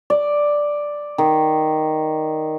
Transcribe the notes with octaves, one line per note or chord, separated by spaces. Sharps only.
D5
D#3